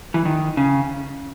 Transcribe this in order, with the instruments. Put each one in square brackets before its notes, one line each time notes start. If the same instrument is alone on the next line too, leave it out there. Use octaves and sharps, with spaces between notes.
[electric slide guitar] E3
D#3
C#3